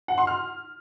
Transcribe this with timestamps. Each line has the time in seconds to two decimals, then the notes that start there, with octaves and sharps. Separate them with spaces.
0.08 F#5
0.18 C6
0.27 F6